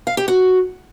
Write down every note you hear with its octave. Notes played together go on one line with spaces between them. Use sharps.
F5
G4
F#4